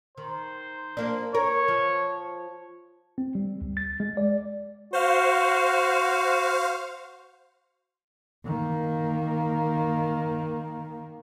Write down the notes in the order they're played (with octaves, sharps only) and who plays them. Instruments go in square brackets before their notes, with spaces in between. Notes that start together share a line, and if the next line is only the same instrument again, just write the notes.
[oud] D#3 [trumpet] C5
[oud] F3 A#3 D4
[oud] A#4 [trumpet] C#5
[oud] F3
[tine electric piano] C4
G3
D2
A6
G#3
D5
[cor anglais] F#4 [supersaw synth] C5 F5
[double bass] D#3 A#3